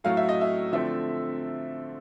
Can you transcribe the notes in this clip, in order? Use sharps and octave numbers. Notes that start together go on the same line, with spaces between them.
A2 F#3 A3 F5
E5
D#5
E5
D3 F3 A3 C4 E5